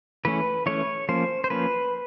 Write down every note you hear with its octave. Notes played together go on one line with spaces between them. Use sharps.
E3 A3 C#4 B4
E3 A3 C#4 C#5
F3 A#3 C#4 C5
C5
F3 A#3 C#4 B4